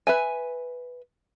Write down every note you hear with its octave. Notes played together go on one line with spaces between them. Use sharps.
B4 E5 G#5